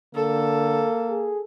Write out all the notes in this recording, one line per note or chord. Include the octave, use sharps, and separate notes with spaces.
D3 A#3 A4
G#4